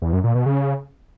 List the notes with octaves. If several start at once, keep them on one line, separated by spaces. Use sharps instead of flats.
E2
F#2
A#2
B2
C#3